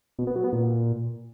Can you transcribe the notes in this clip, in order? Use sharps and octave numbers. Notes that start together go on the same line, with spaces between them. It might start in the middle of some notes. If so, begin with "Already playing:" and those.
B2
B3
F#3
B3
A#2